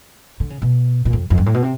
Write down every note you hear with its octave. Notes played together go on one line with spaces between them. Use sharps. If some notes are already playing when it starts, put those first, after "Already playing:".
D3
C#3
B2
A#2
F2
F2
G2
A2
B2
C3